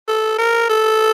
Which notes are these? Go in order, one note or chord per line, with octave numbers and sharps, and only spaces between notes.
A4
A#4
A4